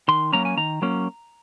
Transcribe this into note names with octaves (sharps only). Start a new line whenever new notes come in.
D#3 C6
F#3 A#3 C#4 A#5
G#5
D#3 A#5
F#3 A#3 C#4